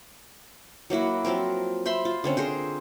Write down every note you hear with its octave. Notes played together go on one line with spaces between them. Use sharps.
F#3 A#3 E4 F#4
F3 F#3 C4 A#4
C5 E5 B5 C6
F4
D3 C4 C#4
G#4 A#4 C5